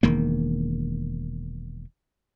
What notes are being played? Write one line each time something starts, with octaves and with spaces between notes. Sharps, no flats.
E1 D#3 A#3